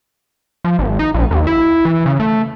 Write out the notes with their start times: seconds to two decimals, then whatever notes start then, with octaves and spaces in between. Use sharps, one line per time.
0.65 F3
0.79 G#1
0.99 D#4
1.14 A#1
1.31 D#2
1.47 E4
1.85 E3
2.06 C#3
2.20 A3